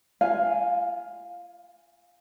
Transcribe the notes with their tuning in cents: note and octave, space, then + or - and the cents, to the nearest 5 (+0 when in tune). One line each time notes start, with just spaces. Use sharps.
F4 -35 F5 +15 G#5 +0